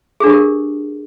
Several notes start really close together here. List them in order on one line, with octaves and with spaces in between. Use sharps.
G#4 D4 B4 G4 A#4